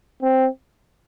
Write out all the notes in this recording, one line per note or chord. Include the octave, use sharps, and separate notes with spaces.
C4